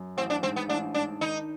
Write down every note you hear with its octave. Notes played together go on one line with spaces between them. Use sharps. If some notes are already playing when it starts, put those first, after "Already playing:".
Already playing: F#2
A1 C4
D4
G#2 C4
B3
A1 D4
G#2 D4
D#3 D#4